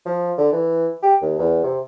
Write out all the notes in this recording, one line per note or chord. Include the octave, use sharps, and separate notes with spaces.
F3
D3
E3
G4
D#2
E2
C3